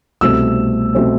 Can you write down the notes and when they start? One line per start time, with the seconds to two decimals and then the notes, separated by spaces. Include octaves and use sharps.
0.21 C2 B2 A3 C4 E6
0.95 B2 A3 C4